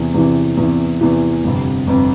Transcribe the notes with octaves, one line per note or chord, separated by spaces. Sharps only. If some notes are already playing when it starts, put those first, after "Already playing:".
Already playing: E2 C3 E3
E2 C3 E3
E2 C3 E3
E2 C3 E3
G1 F2 C3
G1 F2 C3